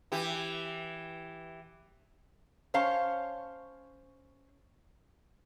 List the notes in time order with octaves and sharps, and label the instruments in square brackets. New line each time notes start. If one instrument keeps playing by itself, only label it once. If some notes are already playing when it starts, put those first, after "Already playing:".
[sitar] E3 G4
[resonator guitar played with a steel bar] C#4 C5 C#5 F5 A5